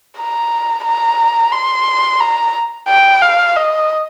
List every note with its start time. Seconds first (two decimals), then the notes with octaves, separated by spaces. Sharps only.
0.18 A#5
0.85 A#5
1.52 C6
2.20 A#5
2.88 G5
3.22 F5
3.56 D#5